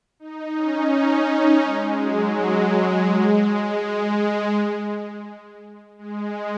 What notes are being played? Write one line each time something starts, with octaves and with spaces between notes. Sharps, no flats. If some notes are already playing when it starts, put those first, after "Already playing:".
D#4
C#4
D#4
C#4
G#3
F#3
G#3
G#3
G#3